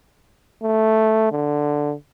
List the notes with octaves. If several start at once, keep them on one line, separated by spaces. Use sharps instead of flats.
A3
D3